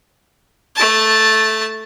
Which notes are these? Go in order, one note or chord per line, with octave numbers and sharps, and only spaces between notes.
A3 A5